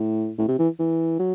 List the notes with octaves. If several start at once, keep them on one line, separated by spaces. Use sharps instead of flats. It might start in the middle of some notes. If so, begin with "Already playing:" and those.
Already playing: A2
A2
C3
E3
E3
F#3